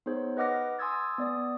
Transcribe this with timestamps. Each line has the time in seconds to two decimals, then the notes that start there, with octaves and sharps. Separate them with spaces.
0.06 B3 D#4 G#4 C5 C#5
0.37 B4 D#5 F#5 D6 F6 A#6
0.79 G#5 C6 D#6 E6 G#6 A6
1.18 B3 D5 D#6